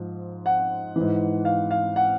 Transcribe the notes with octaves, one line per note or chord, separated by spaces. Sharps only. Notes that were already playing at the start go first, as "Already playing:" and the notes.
Already playing: G#2 F3
F#5
G#2 E3
F5
F5
F#5